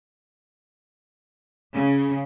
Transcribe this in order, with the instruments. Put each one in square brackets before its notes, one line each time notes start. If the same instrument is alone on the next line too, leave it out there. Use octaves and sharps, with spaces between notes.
[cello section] C#3